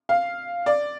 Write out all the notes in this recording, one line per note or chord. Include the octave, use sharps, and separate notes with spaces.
F5
D5